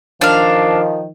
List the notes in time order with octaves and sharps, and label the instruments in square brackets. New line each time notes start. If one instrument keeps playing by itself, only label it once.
[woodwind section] D#3 F3 [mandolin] D4 F5